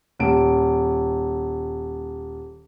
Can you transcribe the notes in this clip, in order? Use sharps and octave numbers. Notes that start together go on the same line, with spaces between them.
D#1 D7